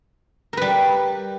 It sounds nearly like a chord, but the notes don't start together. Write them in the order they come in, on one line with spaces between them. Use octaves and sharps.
A#4 B4 G3